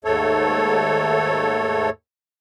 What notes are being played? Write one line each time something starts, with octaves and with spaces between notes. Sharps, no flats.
D#2 G#2 A3 A4 C#5